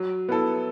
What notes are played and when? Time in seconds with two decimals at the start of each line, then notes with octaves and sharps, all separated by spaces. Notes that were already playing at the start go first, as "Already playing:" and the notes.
Already playing: F#3
0.29 B3 E4 A4